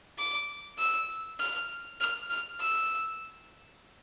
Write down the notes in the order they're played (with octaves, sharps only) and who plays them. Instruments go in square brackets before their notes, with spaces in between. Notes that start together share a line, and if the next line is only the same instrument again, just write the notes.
[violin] D6
E6
F6
F6
F6
E6